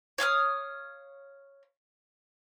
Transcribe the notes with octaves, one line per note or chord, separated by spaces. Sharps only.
C#5 F5 D#6 F6